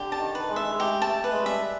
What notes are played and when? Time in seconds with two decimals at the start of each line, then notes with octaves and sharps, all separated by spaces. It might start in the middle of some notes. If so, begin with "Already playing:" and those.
Already playing: D3 G4
0.12 A5
0.19 D#3
0.35 B4
0.49 G#3
0.56 E5
0.71 G#3
0.79 A3 G4
1.02 A5
1.09 A3
1.24 B4
1.32 G#3
1.39 G3
1.46 E5